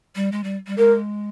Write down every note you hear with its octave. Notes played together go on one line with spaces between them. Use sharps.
G3
G#3
G3
G3
G#3 A#4